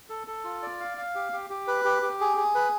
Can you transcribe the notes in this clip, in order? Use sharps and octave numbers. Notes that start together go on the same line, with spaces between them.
A4
A4
F4
D5
F5
F5
G4
G4
G4
B4
G4
G4
G#4
G#4
B4